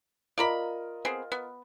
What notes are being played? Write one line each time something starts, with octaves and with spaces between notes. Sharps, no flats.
F4 A#4 D5 D#5 A#5 B5
B3 C4 G#4
B3